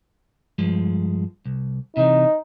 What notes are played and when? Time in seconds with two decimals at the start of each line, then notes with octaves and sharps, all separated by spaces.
0.58 G2 F3 G#3
1.46 C2
1.97 C3 E3 D#4